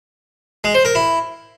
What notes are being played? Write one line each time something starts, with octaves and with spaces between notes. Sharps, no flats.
G#3
C5
A#4
E4